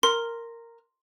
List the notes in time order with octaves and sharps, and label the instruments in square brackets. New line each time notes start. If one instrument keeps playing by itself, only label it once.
[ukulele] A#4 [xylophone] C6